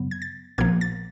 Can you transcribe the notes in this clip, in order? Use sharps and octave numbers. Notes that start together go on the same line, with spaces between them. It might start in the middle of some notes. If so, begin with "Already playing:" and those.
Already playing: F#2 C#3 F#3 B3
G#6
A6
A#1 A#2 F3 A#3 G#6
A6